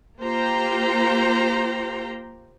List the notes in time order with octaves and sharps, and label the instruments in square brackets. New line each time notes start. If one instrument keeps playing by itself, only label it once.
[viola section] A#3 F4 G4 C5 G5 A#5